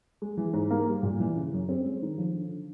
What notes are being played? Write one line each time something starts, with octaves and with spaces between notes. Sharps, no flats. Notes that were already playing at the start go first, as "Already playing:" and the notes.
G#3
E3
G#2
A#3
G3
A#2
E3
C#3
F#2
C4
G#3
D#3
F3
D3